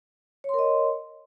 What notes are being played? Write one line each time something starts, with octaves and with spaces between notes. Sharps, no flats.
A#4 C#5 D#5 C6